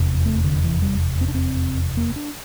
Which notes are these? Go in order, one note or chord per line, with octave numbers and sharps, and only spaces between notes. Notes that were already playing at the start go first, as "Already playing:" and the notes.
Already playing: F1 E2 C3
A3
D3
E3
G3
C4
D4
C4
A#3
D4